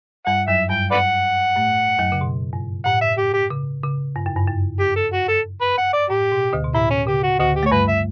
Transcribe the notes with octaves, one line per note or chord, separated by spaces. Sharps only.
G2 G3 F#5
F#2 F#3 E5
G2 G3 G5
B4 D5 F#5
A2 A3
F#2 F#3
C#3
B2
G2
A2 F#5
E5
G4
G4
C#3
C#3
G2
F#2
G2
F#2
G4
A4
F#4
A4
B4
F#5
D5
A2 G4
B2
D2 D3
B2
A2 E4
C#4
C#3 G4
F#4
D2 D3 F#4
G4
A3 C#5
G2 G3 B4
E5